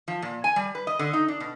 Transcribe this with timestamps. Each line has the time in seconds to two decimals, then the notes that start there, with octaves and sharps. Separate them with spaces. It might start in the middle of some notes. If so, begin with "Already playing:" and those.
0.08 F3
0.22 A#2
0.44 G#5
0.56 G3
0.75 B4
0.87 D#5
0.99 D3
1.13 D#4
1.28 D4
1.40 B2